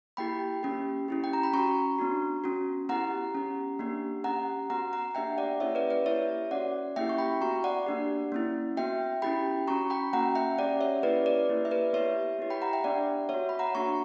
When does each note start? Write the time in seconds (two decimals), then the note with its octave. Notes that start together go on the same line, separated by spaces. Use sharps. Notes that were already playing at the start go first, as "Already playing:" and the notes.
0.17 A#3 E4 G4 G5 B5
0.63 A#3 C#4 G4
1.08 C#4 E4 G4
1.24 G5
1.33 A#5
1.43 B5
1.54 C#4 F#4 A#5 C#6
1.99 B3 D4 F#4
2.44 C#4 F#4
2.89 B3 E4 G4 F#5 A#5
3.35 C#4 G4
3.79 A#3 D4 G4
4.24 C#4 G4 F#5 A#5
4.70 B3 F#4 F#5 A#5
4.93 F#5 A#5
5.15 A#3 D4 G4 E5 G5
5.38 D5 F#5
5.60 A#3 C#4 E4 G4 C#5 E5
5.75 B4 D5
5.90 B4 D5
6.06 A#3 E4 G4 C#5 E5
6.51 C#4 F#4 D5 F#5
6.96 A#3 C#4 E4 G4 E5 G5
7.09 C#6
7.18 G5 B5
7.41 B3 F#4 A#5 C#6
7.64 D5 F#5
7.87 A#3 D4 G4
8.32 A#3 C#4 E4
8.77 B3 F#4 E5 G5
9.22 C#4 E4 G4 G5 B5
9.68 C#4 F#4 A#5 C#6
9.90 G5 B5
10.13 A#3 C#4 F#4 F#5 A#5
10.35 E5 G5
10.58 C#4 G4 D5 F#5
10.80 C#5 E5
11.03 A#3 C#4 E4 G4 B4 D5
11.26 B4 D5
11.49 A#3 E4 G4
11.65 E5
11.71 B4 D5
11.93 B3 E4 G4 C#5 E5
12.39 B3 E4 G4
12.50 G5 B5
12.62 F#5 A#5
12.73 E5 G5
12.84 B3 D4 G4 D5 F#5
13.29 B3 F#4 C#5 E5
13.49 B5
13.59 F#5 A#5
13.75 A#3 D4 F#4 A#5 C#6